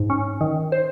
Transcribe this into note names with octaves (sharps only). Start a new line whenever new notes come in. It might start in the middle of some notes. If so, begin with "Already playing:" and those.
Already playing: G#2
C#4
D#3
C5